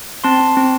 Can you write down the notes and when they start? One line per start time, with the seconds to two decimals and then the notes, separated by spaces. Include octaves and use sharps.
0.24 C4 A5 C6
0.40 C4
0.57 C4